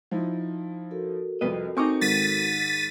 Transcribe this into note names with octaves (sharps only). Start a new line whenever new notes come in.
F3 D#4 E4
F#4 A4 A#4
C2 F2 C3 B4 D#5
C4 D#4 G#5 C#6 D6
G#2 D#3 A6 B6 D#7